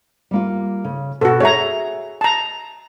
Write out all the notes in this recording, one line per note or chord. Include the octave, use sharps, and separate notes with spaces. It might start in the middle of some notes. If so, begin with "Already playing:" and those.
G3 A#3 F4
C#3
B2 F#4 A4
G#4 C#5 E5 A#5
A5 A#5